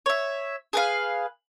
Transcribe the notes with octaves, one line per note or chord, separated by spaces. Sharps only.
C#5 E5
G#4 B4 F5